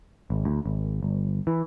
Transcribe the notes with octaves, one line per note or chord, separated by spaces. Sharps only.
G#1
D2
G#1
G1
E3